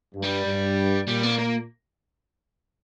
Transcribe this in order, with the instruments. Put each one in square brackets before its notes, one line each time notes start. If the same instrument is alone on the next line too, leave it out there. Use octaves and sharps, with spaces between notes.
[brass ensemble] G2
[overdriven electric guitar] G3
[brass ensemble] G2
[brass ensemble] A#2 [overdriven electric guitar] G3
[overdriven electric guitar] A#3
A#3